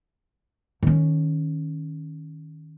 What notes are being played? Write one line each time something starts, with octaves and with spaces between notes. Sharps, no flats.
D#3 C#4